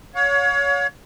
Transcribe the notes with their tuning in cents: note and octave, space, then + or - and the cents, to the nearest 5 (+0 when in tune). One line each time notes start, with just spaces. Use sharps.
C#5 +25 F5 +45